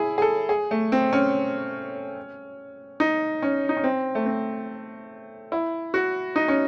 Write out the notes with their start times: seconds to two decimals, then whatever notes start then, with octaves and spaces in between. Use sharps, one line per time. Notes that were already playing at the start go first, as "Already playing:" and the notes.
Already playing: E4 G#4
0.18 G#4
0.22 A4
0.49 G#4
0.71 A3
0.92 C4
1.13 C#4
3.00 D#4
3.42 C#4
3.69 D#4
3.77 C#4
3.84 C4
4.15 A3
4.26 C4
5.52 E4
5.94 F#4
6.36 D#4
6.48 C#4